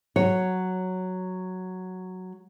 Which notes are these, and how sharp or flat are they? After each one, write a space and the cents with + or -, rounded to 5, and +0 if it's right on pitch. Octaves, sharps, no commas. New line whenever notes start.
F#3 +0 C#5 +0